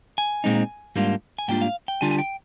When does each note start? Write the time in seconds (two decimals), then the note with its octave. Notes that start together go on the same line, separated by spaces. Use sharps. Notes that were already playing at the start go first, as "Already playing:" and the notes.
0.18 G#5
0.44 A#2 G#3 C4 D#4
0.96 G#2 G3 A#3 D4 F4
1.39 G#5
1.48 G#2 G3 A#3 D4 F4 G5
1.61 F5
1.88 G5
2.01 D3 G3 D4 F4 G#5
2.11 G#5
2.18 G5